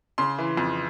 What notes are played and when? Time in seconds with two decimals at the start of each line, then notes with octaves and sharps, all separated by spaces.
0.18 C#3 C6
0.38 E3
0.57 F2